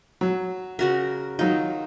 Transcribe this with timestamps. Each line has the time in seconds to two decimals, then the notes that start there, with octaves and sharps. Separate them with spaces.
0.21 F#3
0.79 C#3 F#4 A#4
1.39 D#3 F#3 D#4 F4